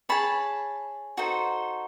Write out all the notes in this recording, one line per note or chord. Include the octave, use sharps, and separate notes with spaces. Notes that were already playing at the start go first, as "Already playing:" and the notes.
G#4 C#5 A5 B5
D#4 F#4 A4 C5